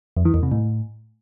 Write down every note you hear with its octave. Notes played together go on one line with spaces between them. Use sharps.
F2
E3
E2
C3
A2